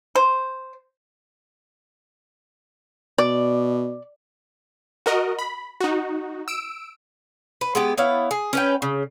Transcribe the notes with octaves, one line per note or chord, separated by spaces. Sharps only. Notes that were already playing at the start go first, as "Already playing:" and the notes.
C5
B2 D5
F#4 A#4 D#5
B5
D#4 F#4
E6 D7
B4
G#3 B3 G4
B3 E4 C#5 F5
G#4
C#4 B4 G5
C#3